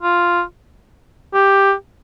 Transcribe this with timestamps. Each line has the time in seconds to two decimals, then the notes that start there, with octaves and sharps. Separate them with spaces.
0.03 F4
1.34 G4